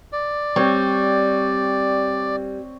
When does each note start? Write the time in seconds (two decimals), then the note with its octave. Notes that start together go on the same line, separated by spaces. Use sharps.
0.12 D5
0.56 G3 C4 C#5